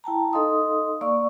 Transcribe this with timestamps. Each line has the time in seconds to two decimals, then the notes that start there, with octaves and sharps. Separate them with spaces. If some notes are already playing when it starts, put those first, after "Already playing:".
0.04 E4 G5 A5 A#5
0.33 D#4 A4 D#5 F5 C6 D#6
1.01 A#3 D5 F5 C#6 E6